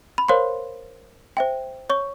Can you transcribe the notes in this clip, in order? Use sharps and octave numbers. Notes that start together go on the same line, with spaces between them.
B5
A#4 C5 C#5 F5 C6
C5 E5 G5
C#5 C#6